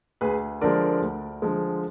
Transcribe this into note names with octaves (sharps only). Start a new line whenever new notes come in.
D2 G#4 B4
D3 F3 G#3 A#4 D5
D2
D3 F3 G#3